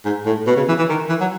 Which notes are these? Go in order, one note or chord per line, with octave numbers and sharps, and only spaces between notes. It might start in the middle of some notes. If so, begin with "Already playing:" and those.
G#2
A2
B2
C#3
E3
E3
D#3
E3
F#3